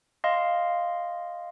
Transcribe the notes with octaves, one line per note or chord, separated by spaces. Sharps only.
D#5 F5 C6